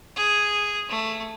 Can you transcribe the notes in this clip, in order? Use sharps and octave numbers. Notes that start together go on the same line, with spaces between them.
G#4
A3